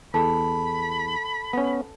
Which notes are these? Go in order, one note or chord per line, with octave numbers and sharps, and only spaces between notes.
E2 A4 A5 B5
B3 C#4